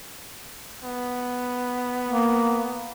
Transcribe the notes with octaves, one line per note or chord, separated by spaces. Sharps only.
B3
A#3